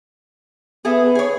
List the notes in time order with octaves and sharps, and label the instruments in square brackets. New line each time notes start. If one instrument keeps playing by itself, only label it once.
[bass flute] B3 [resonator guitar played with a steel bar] G#4 A4 E5
[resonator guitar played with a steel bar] G#4 C#5